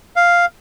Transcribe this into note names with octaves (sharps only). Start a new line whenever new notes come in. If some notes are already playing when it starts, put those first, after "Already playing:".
F5